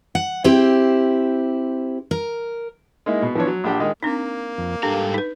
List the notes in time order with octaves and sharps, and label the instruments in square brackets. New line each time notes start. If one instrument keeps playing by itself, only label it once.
[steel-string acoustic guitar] F#5
C4 E4 G4 C5
A#4
[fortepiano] G#3 A#3 D#4 E4
B2
E3 F3 B3 D4 C#5
F#3
A#1 D4 G4 F#5
D#3 G#3 D#4
[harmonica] A#3 [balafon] C4 D4 D#4
[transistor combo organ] F2
[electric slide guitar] G#2 G3 F5 [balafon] D4 [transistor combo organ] G4 A4
[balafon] D#4 B4